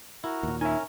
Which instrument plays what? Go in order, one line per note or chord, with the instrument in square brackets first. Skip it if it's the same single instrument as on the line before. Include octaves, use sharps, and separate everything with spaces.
[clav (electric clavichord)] E4 [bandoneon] F#4 A#4
[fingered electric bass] D#2 A#2
[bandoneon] C#4 A#4 [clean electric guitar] D#4 E5 [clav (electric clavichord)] G#5